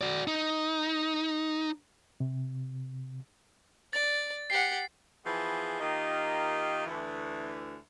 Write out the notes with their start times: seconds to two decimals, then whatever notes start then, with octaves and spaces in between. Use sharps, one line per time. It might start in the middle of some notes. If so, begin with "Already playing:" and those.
0.01 F#4 D5
0.27 D#4
2.20 C3
3.93 D5 A6
4.50 G4 F#5 C7
5.25 E3 F3 B3 G#4
5.80 D#3 A#3 D#4 F4 G4 D#5
6.86 D2 E3